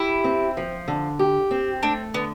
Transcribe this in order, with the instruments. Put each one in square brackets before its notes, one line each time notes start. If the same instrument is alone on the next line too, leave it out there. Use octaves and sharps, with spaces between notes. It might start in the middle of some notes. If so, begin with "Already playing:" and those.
Already playing: [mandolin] E4 [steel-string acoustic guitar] G4
[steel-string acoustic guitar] C4
F3
D3
G4
C4
[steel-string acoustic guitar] A3 [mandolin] D4
[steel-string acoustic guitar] D3 [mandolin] B3